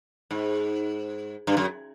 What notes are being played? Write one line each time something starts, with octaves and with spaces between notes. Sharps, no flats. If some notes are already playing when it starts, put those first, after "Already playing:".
G#2
G2
F#2